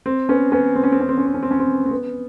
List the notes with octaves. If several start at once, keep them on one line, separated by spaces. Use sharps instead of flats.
C4
B3 C#4
B3 C#4
C4
C#4
C4
C#4
C4
C#4
C4
C#4
C4
C#4
C4
C4
B3